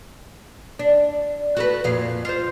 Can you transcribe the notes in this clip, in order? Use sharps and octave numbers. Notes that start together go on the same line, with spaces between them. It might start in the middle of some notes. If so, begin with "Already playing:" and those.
D4
F#4 A4 B4
F2 A#2 F5
F4 C5